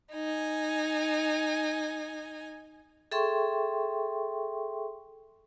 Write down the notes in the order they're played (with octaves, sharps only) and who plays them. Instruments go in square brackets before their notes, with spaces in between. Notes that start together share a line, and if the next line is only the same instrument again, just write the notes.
[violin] D#4 G#5
[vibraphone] G#4 A4 E5 G5 C6 C#6